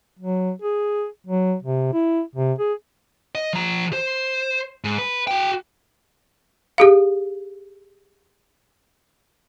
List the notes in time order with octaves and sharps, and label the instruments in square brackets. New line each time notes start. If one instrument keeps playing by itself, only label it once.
[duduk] F#3
G#4
F#3
C3
E4
C3
G#4
[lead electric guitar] D#5
F3 A#5
C5
G#2
B4
F#4 G5
[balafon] G4 G#4 F5